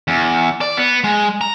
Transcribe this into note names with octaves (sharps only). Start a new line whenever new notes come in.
E2
D5
B3
G#3
A#5